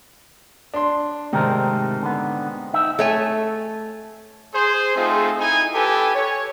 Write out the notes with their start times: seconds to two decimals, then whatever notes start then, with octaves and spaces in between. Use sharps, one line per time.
0.74 D4 C6
1.33 G#2 C3 D#3 A3 C4 A#4
2.03 D3 B3
2.74 D#4 E5
2.99 A3 C#5 G#5
4.54 G#4 C5
4.95 A3 C4 D#4 F4 G#4
5.40 D#4 E4 G#5
5.74 G4 A4 B4 G#5
6.15 C#5